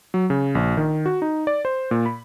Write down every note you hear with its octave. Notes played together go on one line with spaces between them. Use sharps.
F#3
C#3
A#1
D#3
F#4
D#4
D5
C5
A#2
B5